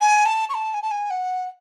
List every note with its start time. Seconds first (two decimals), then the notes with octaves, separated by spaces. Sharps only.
0.01 G#5
0.25 A5
0.49 C#6
0.54 A5
0.74 G#5
0.82 A5
0.91 G#5
1.10 F#5